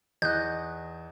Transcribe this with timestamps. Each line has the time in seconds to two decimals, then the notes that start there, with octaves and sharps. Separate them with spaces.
0.22 E2 D#5 F#6 G6